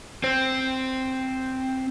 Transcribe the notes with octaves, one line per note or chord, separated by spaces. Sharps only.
C4 C5